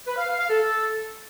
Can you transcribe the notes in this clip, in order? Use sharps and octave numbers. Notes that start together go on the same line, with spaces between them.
B4
F5
F5
F5
A4